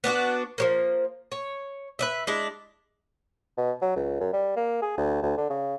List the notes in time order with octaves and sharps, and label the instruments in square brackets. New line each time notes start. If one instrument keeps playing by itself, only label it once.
[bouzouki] B3 D4 F4 F#4
F3 F#3 A#3
C#5
B4 D#5 E5
G#3 D4 E4
[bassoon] B2
F#3
C#2
F#2
G3
A#3
G#4
D2
D2
D3
C#3